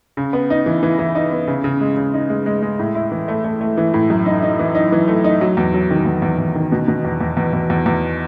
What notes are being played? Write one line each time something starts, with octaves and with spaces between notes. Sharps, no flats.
C#3
B3
D#4
E3
E3
E3
D#4
B3
C#3
C#3
G#3
C#3
D#4
G#3
G#3
G#3
A2
E4
E3
A3
A3
A3
E3
A2
F#2
D#4
D#4
E3
D#4
E3
A3
D#4
F#3
E2
F#3
D#3
E2
E2
E2
D#3
B2
B2
E2
E2
E2
E2
E2
E2